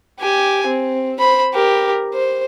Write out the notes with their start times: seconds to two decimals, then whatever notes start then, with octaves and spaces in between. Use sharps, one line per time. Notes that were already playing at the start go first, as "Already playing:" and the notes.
0.20 G4 G#5
0.67 C4
1.19 C5 B5
1.54 G4 A#4
2.14 C5